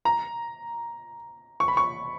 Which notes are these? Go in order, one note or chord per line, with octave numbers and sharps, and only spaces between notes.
A#5
C#6
B5
C#6